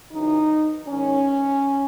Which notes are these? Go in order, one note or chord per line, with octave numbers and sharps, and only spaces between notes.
F#2 C#3 E3 D#4
G#2 D#3 C#4